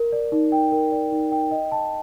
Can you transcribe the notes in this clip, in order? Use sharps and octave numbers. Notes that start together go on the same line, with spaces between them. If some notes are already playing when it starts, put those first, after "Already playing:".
Already playing: A#4
D5
D#4
G5
A#4
D5
D#4
G5
D#5
A5